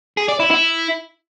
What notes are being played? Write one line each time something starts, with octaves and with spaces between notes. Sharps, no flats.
G#4
D5
E4
E4